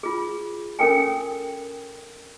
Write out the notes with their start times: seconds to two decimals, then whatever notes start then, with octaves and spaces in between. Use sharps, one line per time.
0.03 F4 G#4
0.79 C#4 A4 A#4 G5 G#5